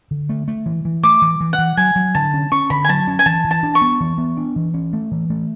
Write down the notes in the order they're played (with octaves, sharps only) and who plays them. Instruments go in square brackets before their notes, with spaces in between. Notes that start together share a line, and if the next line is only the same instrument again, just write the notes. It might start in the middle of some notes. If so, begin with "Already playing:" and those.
[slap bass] D3
A3
A3
E3
E3
[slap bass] A3 [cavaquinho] D6
[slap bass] E3
E3
[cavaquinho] F#5
[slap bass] E3
[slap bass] F#3 [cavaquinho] G#5
[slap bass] F#3
[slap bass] D3 [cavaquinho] A5
[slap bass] C#4
[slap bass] C#4 [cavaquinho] C#6
[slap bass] D3 [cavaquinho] B5
[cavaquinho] G#5
[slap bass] F#3 [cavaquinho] A5
[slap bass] C#4
[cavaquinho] G#5
[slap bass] E3 [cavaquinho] A5
[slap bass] E3
[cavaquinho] A5
[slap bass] D4
[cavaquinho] C#6
[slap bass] B3
E3
B3
D4
E3
C#4
A3
E3
A3